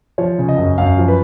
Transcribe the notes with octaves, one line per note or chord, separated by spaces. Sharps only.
F3 C#5
C#3
D#5
F#2
F#2 F5
F3
B4